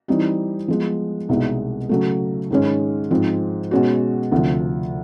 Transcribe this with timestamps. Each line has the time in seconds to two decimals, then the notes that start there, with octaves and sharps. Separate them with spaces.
0.08 E3 G3 C4 D#4
0.68 F3 G#3 B3
1.29 C2 B2 G#3 B3 D#4
1.89 C#3 F#3 A3
2.51 G#2 D#3 G#3 C#4
3.11 G#2 F3 G#3 C4
3.71 B2 G#3 C#4 F#4
4.32 D2 C3 F3